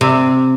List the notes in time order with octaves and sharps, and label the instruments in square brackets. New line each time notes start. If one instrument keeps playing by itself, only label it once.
[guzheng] C3